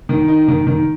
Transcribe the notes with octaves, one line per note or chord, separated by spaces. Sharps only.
D#3
D#4
D#3
D#3